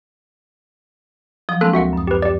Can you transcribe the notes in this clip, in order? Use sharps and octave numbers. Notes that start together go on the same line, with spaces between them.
F3 F#3 D#6
G#3 A#3 C4 D4 A4 F#6
D2 F#4 A#4 E5 F#5
F#2 D#6
G4 B4
G4 D5 D6